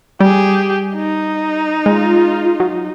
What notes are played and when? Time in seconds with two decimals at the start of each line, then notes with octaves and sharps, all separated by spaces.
0.20 G3 G4 G#4
0.95 D#4
1.86 G#3 F4
2.60 F#3